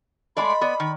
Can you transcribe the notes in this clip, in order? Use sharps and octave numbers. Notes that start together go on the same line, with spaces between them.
G#3 A3 D5 D#5 B5 C6
B3 D5
D#3